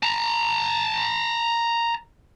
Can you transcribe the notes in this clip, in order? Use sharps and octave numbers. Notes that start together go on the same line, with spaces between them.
A5 A#5